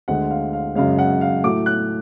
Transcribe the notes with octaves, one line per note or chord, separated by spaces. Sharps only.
D2 D3 G#3 F#5
F5
F5
F#2 C#3 G#3 F5
F#5
F5
A2 F#3 A3 D6
F#6